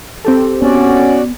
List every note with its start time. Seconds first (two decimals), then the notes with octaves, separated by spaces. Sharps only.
0.25 C4 G4 A4
0.62 B3 C#4 F#4 D5